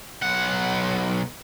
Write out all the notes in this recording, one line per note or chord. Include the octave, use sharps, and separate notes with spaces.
B1 F#5